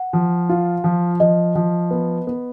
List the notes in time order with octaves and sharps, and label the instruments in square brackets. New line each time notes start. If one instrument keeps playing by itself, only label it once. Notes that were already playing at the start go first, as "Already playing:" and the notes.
Already playing: [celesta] F#5
[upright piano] F3
F4
F3
[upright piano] F3 [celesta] D#5
[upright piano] F3
B3
B3